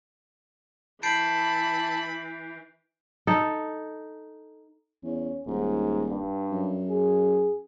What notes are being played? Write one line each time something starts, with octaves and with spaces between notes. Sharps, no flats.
E3 A5 B5 G6 C7 D7
D#4 A4
E2 C#4
D#1 G#2
G2
F#2
G#4